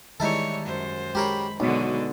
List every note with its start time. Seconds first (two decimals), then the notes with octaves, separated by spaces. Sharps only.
0.20 D#3 E3 G3 G#3 D#4 E4 A4 C#5
0.65 F#2 C5
1.15 G#3 G4 A#4 C#5 B5
1.60 B1 B2 D3 G#3 B3 D#4 F#4